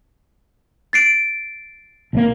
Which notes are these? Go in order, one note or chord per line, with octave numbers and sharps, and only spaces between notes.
A6 C7 D7
B1 F#3 A#3